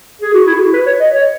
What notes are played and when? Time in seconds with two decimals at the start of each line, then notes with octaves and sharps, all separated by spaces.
0.22 G#4
0.34 F#4
0.47 E4
0.55 G#4
0.60 F#4
0.74 B4
0.86 C#5
1.00 D#5
1.13 C#5